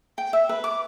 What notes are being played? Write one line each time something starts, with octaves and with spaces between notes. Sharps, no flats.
G5
E5
B4
D6